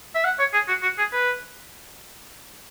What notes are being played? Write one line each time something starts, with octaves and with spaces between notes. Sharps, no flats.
E5
F#5
C#5
G#4
F#4
F#4
G#4
B4